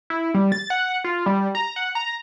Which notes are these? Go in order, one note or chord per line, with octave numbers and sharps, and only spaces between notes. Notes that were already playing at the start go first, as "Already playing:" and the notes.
E4
G3
A6
F#5
F4
G3
A#5
F#5
A#5